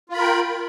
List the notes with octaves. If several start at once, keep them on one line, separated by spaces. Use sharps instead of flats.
F4 A#4 G5 B5